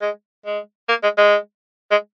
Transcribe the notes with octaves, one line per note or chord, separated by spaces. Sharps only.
G#3
G#3
A#3
G#3
G#3
G#3